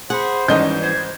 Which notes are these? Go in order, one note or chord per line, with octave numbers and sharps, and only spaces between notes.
G#4 C5 F#5 B5
G#1 E3 G3 B3 C#4 D#4 D#5 G6
C5 G#6